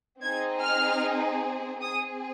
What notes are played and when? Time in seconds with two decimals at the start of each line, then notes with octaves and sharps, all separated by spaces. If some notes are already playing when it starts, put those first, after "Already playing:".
0.22 C4 D#4 G#4 G#6
0.63 F6
1.81 C4 G#4 D#6